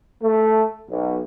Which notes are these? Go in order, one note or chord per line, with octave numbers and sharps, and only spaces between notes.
A3
B1